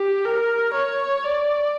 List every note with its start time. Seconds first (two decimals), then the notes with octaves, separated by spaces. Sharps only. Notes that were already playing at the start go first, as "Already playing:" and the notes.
Already playing: G4
0.25 A#4
0.74 C#5
1.24 D5